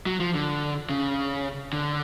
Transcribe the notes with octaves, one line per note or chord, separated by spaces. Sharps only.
F#3
F3
D3
C#3
D3